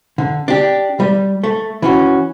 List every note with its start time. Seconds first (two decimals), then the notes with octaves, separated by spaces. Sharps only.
0.18 D3
0.48 D4 G4
1.00 G3
1.43 A3
1.82 E3 C#4 F#4